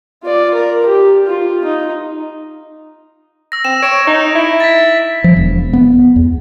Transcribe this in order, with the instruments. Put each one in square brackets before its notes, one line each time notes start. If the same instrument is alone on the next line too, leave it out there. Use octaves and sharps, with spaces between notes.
[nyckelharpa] F4 D5
A#4
G4
F4
D#4
[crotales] E6 A#6
[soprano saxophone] C4 [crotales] E7
[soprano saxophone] C#5 [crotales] D7 E7
[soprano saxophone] D#4
E4
[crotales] A6 B6
[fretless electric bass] F3
E1
B3
E2